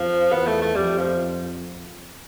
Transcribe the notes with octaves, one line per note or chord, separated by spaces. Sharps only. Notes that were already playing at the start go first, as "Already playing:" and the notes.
Already playing: F2 F3
E2 B3
A3
A3
F2 G3
F3